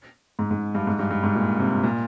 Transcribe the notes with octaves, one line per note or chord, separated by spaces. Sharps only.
G#2
G#2
G2
G#2
G2
G2
G#2
A#2
C3
A#2